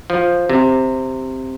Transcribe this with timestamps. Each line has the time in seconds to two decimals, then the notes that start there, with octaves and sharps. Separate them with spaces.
0.10 F3
0.49 C3